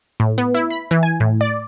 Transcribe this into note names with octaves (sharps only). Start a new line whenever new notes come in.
A2
B3
E4
B5
E3
G#5
A2
D5